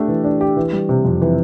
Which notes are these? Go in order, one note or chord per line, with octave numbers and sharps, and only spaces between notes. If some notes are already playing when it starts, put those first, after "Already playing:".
Already playing: A3 D4 G4
E3
D4
G4
E3
G3
C3
F2
E3